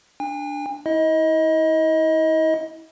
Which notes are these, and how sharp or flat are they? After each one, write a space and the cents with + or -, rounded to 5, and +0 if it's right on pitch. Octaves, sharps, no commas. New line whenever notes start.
D4 +0 G#5 -45
E4 -35 D#5 +25